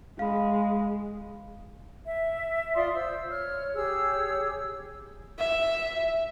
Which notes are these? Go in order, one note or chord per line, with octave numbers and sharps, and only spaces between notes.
G#3 F5 B5
E5
F4 D5 C6 D#6
C5 E6
C#5 F6
G4 G#4 C#5 E6
E5